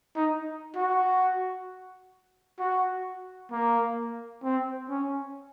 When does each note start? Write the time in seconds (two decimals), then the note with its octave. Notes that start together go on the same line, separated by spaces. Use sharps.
0.16 D#4
0.76 F#4
2.59 F#4
3.51 A#3
4.44 C4
4.89 C#4